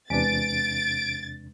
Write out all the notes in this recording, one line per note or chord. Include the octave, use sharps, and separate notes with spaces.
E2 C3 G#3 D4 B4 A6 D7